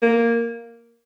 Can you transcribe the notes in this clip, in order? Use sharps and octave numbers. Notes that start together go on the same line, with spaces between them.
A#3